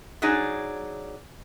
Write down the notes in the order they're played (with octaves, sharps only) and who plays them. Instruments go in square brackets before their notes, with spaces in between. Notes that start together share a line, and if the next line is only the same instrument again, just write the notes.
[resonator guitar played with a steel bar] F#3 D4 D#4 G#4